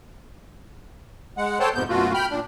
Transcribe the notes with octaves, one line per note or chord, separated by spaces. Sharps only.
G#3 F#5
A4 C5 C#5 G5 A5
F2 G#2 C3 B3 G6
F#2 B2 A3 F4 F#4
G5 B5 F6
A#2 D4